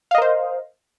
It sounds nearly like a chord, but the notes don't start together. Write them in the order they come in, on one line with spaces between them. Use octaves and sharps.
F5 D#5 A#4 C5